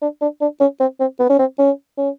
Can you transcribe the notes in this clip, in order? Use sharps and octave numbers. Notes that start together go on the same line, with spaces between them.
D4
D4
D4
C#4
C4
C4
B3
C#4
C4
C#4
C#4